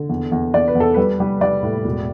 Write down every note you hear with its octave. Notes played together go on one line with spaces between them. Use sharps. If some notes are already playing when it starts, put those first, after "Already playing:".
Already playing: D3
E2
E2
E2 D5
B4
E2
A4
G3 B4
G3
G3 D5
A2
E1